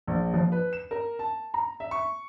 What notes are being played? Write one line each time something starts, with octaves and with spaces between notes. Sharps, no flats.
A#1
F3
B4
E7
A#4
A5
A#5
E5
C#6